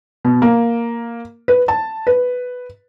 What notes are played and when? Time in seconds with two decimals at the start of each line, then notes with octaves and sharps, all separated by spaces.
0.25 B2
0.42 A#3
1.48 B4
1.68 A5
2.07 B4